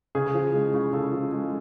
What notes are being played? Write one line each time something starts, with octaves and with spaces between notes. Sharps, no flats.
C#3 G#4
F3
G#3
C#3
C#3 A4
F3
G#3